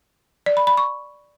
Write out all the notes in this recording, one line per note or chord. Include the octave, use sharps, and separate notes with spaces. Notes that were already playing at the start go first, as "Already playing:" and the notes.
D5
B5
B5
C#6